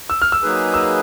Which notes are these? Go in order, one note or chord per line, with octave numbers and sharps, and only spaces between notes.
E6
F6
E6
F#3 A#3 D#4 G#4 B4
E6